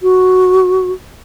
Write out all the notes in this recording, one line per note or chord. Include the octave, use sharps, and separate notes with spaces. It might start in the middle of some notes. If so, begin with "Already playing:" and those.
F#4